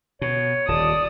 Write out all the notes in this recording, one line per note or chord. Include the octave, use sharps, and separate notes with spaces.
B2 C#5
D#1 D5 A5 D#6